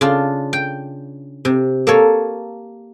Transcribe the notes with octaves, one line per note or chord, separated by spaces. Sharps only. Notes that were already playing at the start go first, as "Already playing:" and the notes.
C#3 D4 F4
G5
C3
A#3 A4 C#5